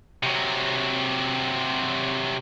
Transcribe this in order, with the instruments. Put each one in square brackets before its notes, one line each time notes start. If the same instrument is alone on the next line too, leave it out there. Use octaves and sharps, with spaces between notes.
[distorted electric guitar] C3 F#3